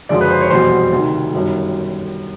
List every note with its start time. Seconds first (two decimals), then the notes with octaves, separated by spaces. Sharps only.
0.09 F#1 F#2 D3 F3 G#3 D5
0.21 B4
0.30 C5
0.41 C#5
0.50 F1 E2 B2 G3 C5
0.93 D2 C3 D#3
1.33 G1 F#2 D#3 G3